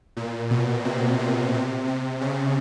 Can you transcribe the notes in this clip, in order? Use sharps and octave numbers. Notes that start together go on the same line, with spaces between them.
A#2
B2
C3
C3
C3
C3
C#3